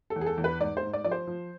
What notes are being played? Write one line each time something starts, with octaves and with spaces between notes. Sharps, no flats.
A4
E2
G#4
A4
E2
B4
G#2 D5
C5
G#2
D5
F3 D5
C5
F3